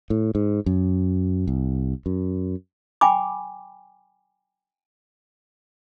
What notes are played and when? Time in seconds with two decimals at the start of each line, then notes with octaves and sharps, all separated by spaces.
0.10 A2
0.35 G#2
0.66 F#2
1.47 C2
2.06 F#2
3.01 G5 G#5 B5 D6